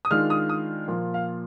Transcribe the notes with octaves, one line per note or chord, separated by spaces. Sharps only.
D#6
D#3 G#3 D4 F4 F6
D#6
D#6
A#2 F3 A#3 F4
F5